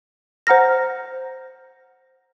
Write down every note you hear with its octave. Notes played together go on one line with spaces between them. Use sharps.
C5 F#5 A#5 F6 A#6